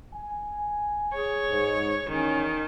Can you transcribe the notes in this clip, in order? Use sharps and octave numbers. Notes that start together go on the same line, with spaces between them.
G#5
G#4 C#5
G#2
E2 D#3 C#4